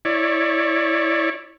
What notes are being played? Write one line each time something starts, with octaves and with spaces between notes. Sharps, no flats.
E4 C#5 D5